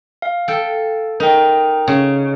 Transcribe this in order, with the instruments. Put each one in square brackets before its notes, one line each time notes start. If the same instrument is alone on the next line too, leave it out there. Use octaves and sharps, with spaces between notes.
[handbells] F5
[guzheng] A4 G5
[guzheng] D#4 [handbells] A#4 G5
[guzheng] C#3